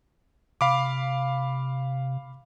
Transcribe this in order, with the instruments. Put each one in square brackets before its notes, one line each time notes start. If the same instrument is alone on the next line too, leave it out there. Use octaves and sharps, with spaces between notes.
[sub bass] C3 [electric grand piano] F5 B5 D6